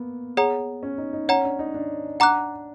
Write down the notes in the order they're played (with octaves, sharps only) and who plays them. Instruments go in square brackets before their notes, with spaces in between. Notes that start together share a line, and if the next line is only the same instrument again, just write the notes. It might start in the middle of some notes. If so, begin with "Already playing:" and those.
Already playing: [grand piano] A#3 B3
[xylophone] G#4 C#5 F#5 A#5
[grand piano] C#4
D#4
D#4
[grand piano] C#4 [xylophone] C#5 F#5 A#5
[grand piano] D4
D#4
D4
[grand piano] D4 [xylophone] F#5 A#5 D6 F#6